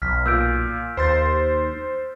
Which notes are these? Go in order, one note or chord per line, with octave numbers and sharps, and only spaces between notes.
B1 F6 B6
A#2 E6 G6 D7
D#2 C5 C6 A6